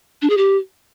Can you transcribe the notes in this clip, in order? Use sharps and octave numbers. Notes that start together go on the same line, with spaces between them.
D4
G#4
G4